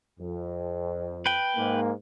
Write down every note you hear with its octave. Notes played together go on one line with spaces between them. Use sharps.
F2
B4 G5
G#2 A#3